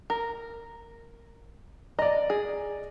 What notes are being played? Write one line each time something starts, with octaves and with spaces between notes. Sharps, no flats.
A#4
D5 D#5 A#5
G#4